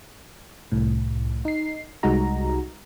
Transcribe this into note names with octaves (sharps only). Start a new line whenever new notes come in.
C2 A2
D#4 C7
C2 G3 G#3 D#4 F#4 A#5